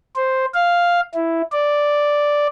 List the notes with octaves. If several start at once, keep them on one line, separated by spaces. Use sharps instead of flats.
C5
F5
E4
D5